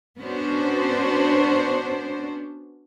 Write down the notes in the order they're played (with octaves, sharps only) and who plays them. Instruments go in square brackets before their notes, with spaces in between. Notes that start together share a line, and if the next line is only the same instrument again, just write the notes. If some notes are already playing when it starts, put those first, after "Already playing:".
[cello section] B3 C#4 D4 F#4 C5